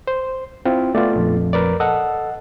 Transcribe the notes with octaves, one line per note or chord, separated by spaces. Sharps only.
C5
C4 E4 F4
A3 B3 F4 D5
A#1 F2
A#4 B4 D5
A4 D#5 F#5